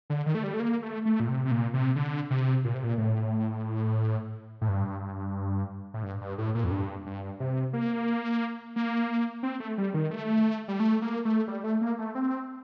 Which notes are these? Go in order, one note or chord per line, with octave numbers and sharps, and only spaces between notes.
D3
D#3
A3
G3
A3
A#3
A3
A3
A#2
C3
C3
A#2
C3
D3
C3
A#2
C3
A#2
A2
A2
G2
A2
G2
G2
A2
A#2
F2
G2
G2
C3
A#3
A#3
C4
A3
G3
D#3
A3
G3
A3
A#3
A3
G3
A3
A#3
A3
C4